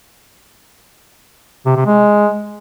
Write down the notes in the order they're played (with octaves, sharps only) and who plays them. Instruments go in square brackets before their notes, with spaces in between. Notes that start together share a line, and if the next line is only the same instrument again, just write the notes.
[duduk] C3
C3
G#3